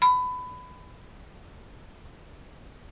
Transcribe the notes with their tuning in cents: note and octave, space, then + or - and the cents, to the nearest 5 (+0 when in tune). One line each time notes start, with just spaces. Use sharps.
B5 +20